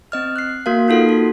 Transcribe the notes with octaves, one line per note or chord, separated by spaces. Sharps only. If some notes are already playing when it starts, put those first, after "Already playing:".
C4 D#5 F6
F#6 C7
A#3 F#4 A#4 F5
A#3 D#4 F4 A4 F#5 C7
F#4